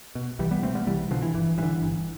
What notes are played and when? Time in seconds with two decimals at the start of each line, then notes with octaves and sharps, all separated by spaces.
0.15 B2
0.39 C2 E3 G3
0.51 G3 B3
0.62 B2 A3 C4
0.75 G3 B3
0.87 C2 E3 G3
1.11 B2 D3 F3
1.22 E3
1.34 G1 E3
1.58 G2 D3 E3
1.82 G1